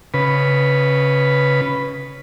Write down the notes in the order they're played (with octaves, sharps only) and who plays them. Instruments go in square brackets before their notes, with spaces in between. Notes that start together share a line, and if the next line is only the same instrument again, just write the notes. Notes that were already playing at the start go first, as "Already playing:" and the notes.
[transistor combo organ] C#3 B4